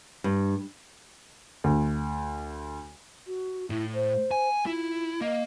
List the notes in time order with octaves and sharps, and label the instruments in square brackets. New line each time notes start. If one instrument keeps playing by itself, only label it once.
[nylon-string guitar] G2
[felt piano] D2
[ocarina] F#4
[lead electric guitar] A2 [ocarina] E4
[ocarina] C5
[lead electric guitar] G#5
[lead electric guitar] E4 [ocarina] F4
[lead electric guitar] A#3 [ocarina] D#5